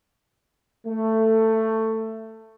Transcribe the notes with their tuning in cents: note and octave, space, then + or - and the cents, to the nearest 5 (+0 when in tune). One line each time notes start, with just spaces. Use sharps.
A3 +15